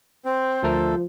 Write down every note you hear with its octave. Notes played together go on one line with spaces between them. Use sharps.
C4 C5
D2 F3 A3 A4 A#4